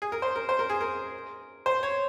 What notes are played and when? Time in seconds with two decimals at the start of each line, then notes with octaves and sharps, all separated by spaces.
0.02 G#4
0.12 A#4
0.22 C5
0.36 A#4
0.49 C5
0.59 A#4
0.69 G#4
0.81 A#4
1.66 C5
1.83 C#5